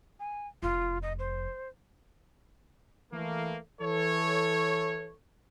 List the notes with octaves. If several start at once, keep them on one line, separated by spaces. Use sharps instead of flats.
G#5
F1 F2 F4
D#5
C5
E3 A3 A#3
E3 A4 C#5